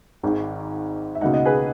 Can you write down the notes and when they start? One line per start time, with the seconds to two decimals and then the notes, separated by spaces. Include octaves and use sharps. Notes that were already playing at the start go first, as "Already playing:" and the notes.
0.23 G#1 G#2 D#3
1.15 E5
1.21 C#2 B2 A#3 D#4 D#5 F#5
1.34 D#5 F#5
1.45 G#4 B4